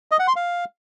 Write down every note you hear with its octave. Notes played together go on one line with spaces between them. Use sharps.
D#5
F#5
C6
F5